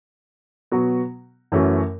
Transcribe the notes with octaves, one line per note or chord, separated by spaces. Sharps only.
B2 F#3 B3 F#4
F#2 E3 A3 C#4 F#4